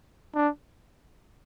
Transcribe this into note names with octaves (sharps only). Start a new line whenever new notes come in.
D4